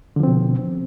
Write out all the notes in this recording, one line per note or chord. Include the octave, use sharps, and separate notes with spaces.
B2 D3 F3 C4